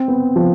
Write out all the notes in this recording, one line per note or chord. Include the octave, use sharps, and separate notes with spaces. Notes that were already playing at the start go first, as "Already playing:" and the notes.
Already playing: C4
B3
F3